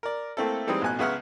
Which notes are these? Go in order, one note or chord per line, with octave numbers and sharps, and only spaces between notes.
A#4 D5
A3 A#3 C4 E4 A4
E3 G3 G#3 C4 D#4
A1 B2 G#5 F#6
C#2 C#3 B3 E5 F#5 F6